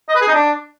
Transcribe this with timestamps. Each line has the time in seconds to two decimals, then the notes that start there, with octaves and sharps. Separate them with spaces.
0.09 D#5
0.15 B4
0.21 G#4
0.28 D#4
0.34 D4